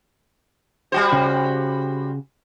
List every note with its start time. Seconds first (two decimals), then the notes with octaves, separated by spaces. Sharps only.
0.92 G3 F#4 C5
1.12 C#3